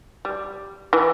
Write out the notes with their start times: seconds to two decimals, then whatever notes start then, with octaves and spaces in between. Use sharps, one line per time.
0.25 G3
0.93 E3